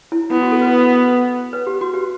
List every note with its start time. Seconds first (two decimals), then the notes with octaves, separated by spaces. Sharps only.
0.12 E4
0.31 B3 E4
0.42 F#4
0.52 A4
0.62 B4
1.53 B4
1.67 G4
1.81 F#4
1.94 G4